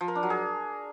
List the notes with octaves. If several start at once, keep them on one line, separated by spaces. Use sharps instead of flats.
F3
A#4
D4
F#3
G#4